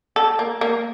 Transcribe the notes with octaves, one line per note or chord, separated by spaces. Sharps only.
A4
A#3
A#3